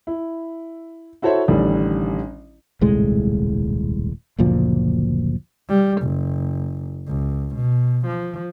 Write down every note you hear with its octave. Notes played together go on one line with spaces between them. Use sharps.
E4
E4 F#4 A4 C5 C#5 E5
A1 D3 D#3 G3
D#1 C2 A2 G#3
F#1 D2 A#2 F3
G3
F#1
C#2
B2
F3